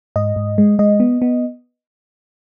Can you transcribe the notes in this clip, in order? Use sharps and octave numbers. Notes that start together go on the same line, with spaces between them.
G#2 D#5
G#2
G#3
G#3 D#5
B3
B3